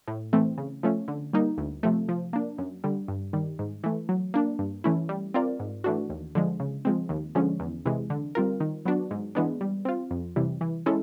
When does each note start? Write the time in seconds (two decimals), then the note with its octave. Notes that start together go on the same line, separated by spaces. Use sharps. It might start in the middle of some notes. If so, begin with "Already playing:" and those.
0.08 A2
0.33 E3 A3 C4
0.58 C#3
0.83 F3 A3 C#4
1.08 D3
1.33 G3 A#3 D#4
1.58 D2
1.83 C3 F3 A3
2.09 F3
2.33 A#3 D4
2.58 F#2
2.84 D3 G3
3.08 G2
3.33 D#3 G3
3.59 G#2
3.84 E3 A3
4.09 F#3
4.34 A#3 D4
4.59 G2
4.84 E3 A3 C#4 E4
5.09 G3
5.34 C4 F4 A#4 D5
5.60 G#2
5.84 E3 A3 D4 F#4
6.10 D#2
6.35 D3 F3 G#3
6.60 C#3
6.85 F3 G#3 C4
7.09 D#2
7.35 D3 F3 G#3 C#4
7.60 E2
7.85 C3 E3 G#3
8.10 D3
8.35 G3 C4 F4 A#4
8.60 D#3
8.85 F#3 B3 D4 F#4
9.11 G#2
9.35 E3 G#3 B3 D4
9.61 G3
9.85 C4 F4
10.11 F2
10.36 C3 E3 G3
10.61 E3
10.86 G#3 C#4 E4 A4